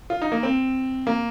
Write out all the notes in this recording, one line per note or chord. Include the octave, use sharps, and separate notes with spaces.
F4
D#4
A#3
C4
A#3